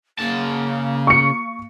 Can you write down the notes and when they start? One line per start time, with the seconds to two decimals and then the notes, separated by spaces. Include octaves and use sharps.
0.18 C#3 A#3 A5
1.07 C#6 C#7